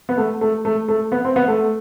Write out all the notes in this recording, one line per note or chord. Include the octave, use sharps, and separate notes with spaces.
B3
A3
A3
A3
A3
B3
C4
B3
A3